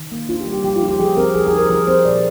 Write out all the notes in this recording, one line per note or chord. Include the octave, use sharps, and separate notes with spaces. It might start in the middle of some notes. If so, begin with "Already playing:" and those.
Already playing: D#3
A#3
D4 F4
G4
G3
G4
F3 G4
F4
D#4
G4
F3 G#4
C4 A#4
F3 G#4
G#4
D#4
A#4
F3 A#4
C4 C5
A#2 D5